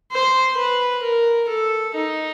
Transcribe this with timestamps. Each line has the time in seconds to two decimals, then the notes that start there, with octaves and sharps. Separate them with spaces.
0.12 C5
0.58 B4
1.04 A#4
1.49 A4
1.95 D#4